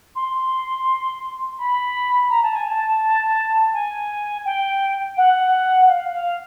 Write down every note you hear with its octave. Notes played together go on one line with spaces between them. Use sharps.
C6
B5
A#5
A5
G#5
A5
G#5
G5
F#5
F5
F5